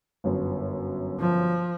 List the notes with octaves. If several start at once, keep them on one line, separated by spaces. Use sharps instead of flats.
G1 F#2
F3